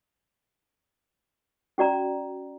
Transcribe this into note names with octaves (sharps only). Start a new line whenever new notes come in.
C#4 F#4 D5 A#5